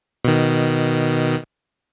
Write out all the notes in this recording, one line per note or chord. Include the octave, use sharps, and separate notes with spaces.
B2 D#3